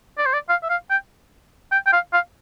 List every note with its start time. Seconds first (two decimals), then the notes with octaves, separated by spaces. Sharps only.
0.18 D5
0.26 C5
0.34 D5
0.49 F5
0.63 E5
0.70 F5
0.90 G5
1.72 G5
1.87 G5
1.93 F5
2.13 F5